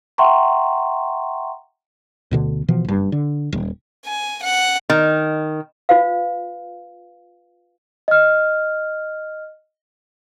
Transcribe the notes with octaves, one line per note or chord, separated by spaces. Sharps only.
E5 F#5 G5 A#5 C6 C#6
D2 B2 D3
B2 E3 F3
F#1 G2
D3
D#1
G#5
F#5
D#3
F4 B4 F5
D#5 F6